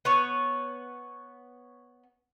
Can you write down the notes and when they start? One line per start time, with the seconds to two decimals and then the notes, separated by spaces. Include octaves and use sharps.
0.05 B3 C#5